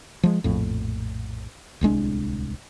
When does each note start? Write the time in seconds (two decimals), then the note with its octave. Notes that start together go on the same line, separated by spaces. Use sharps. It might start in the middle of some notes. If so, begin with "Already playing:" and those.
0.23 F3 G#3
0.44 A#1 F2 A2
1.81 D1 C2 G#3 D4